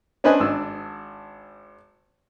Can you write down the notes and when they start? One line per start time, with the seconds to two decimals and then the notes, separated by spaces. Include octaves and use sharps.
0.24 C#4 D4 B4 C5 D#5 G#5
0.40 G#1 D4 E6